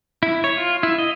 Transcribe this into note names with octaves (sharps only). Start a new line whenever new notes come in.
E4
C#5
F4
E4
D#5